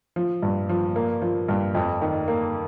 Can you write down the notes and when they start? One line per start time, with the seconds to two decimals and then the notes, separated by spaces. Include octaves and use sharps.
0.16 F3
0.43 G2
0.69 F3
0.96 A#3
1.22 F3
1.48 G2
1.75 F2
2.02 D#3
2.28 A#3